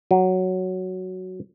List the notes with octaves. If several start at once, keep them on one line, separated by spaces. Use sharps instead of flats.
F#3